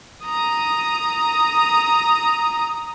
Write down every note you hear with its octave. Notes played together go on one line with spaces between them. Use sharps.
A#5 D#6